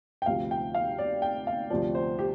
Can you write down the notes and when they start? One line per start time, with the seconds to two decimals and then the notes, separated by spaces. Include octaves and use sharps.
0.22 G5
0.26 D2 C3 F3 F5
0.51 G5
0.75 F5
0.98 D5
1.22 G5
1.47 F5
1.70 D2 C3 F3 D5
1.95 C5
2.19 G4